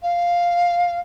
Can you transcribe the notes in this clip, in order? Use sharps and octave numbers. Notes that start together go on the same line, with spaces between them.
F5